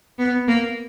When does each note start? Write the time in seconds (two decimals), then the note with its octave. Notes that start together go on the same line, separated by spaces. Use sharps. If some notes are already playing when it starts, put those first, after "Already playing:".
0.18 B3
0.48 A#3